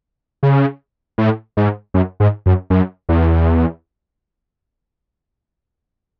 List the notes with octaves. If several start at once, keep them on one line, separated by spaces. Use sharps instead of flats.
C#3
A2
G#2
F#2
G#2
F#2
F#2
E2